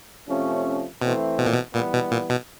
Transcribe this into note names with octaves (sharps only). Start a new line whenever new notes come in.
C3 F3 A3 C#4
B2 E3 A3 C4
B2
A#2
B2
A#2 E3 G3 B3
B2
A#2
B2